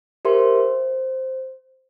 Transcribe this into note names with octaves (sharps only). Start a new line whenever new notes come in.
G4 A#4 C5 E5 C6
C5